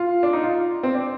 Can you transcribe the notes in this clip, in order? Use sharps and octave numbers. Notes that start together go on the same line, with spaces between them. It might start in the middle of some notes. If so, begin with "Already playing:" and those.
Already playing: F4
D4
D#4
F4
C4
D4